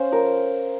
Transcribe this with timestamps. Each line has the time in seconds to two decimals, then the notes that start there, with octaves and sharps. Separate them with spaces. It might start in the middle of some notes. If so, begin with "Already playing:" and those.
Already playing: C#4 C5 F5
0.12 F3 A#4